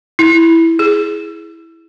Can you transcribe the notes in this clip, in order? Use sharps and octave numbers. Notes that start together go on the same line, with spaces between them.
E4
G#4